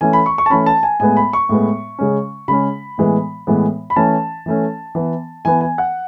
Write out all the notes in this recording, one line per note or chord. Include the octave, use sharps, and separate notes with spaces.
E3 A3 C#4 G#5
B5
C#6
C#6
A5
E3 A3 C#4 B5
A5
G#5
A2 G#3 B3 G#5
B5
C#6
A2 G#3 B3
C#3 G#3 C#4
C#3 G#3 C#4 B5
A2 E3 G#3 B3
A2 E3 G#3 B3
B5
E3 A3 C#4 A5
E3 A3 C#4
E3 B3
E3 B3 G#5
G#5
F#5